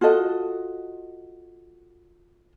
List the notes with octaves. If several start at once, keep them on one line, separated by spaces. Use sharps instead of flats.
F4 F#4 A4 D#5